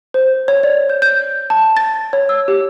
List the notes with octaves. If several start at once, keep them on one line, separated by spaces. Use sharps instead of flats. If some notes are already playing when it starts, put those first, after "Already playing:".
C5
C#5
D5
G6
G6
A5
A6
C#5
E6
G4